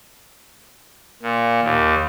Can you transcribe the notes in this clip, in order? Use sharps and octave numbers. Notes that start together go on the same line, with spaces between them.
A#2
D#2